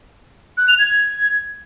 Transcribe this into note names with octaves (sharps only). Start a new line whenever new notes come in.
F#6
F7
G#6